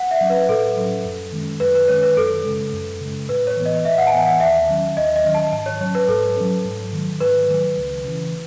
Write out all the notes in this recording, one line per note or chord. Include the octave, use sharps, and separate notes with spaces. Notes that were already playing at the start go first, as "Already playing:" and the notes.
Already playing: F#5
E5
F#3 C#4
B4
A2 A4
F#3 C#4
F#2
D#3 G#3 C#4
F#2 B4
B4
D#3 G#3 C#4 C#5
B4
F#2 A4
C#3 G#3
F#2
C#3 G#3
A2 B4
C#5
E3 B3
D#5
A2 E5
F#5
A5
E3 B3 G#5
F#5
D#2 E5
D#3 F#3 C#4
D#2 D#5
D#5
D#3 F#3 C#4
A5
G#2 A5
C#5
F#3 C#4 C#5
B4
G#2 A4
F#3 C#4
G#2
D#3 F#3 A3
G#2 B4
D#3 F#3 A3
C#2
C#3 E3